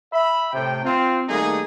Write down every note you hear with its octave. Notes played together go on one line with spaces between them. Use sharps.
E5 B5
A2 C3 G5
C4 F4
D#3 G3 A3 A#3 D#4 G#4